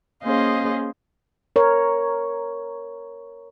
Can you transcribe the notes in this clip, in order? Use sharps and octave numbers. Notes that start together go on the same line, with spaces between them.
A#3 C#4 G#4 C5 D#5 F5
A#4 C#5